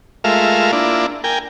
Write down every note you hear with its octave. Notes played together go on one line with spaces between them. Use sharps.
G#3 A3 F4 A#4 E5 F5
A#3 D4 E4 F4
A#4 G5 G#5